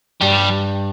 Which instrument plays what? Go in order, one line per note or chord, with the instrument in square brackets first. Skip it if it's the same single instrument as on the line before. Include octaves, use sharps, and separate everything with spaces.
[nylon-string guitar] G2 [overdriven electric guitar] G3